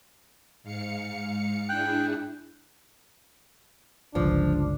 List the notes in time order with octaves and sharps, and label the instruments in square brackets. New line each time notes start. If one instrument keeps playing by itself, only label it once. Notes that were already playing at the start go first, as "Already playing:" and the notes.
[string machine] G#2 F5 C#7
[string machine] D4 E4 G#4 [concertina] G5 F#6
[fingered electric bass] G1 C#2 [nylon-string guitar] F3 [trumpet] D4